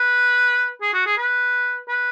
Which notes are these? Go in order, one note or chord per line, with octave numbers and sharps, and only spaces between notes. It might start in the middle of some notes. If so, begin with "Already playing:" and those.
Already playing: B4
G#4
F#4
G#4
B4
B4